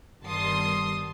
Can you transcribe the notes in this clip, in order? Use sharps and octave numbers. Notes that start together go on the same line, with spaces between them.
G1 D#3 G3 A5 C6 D#6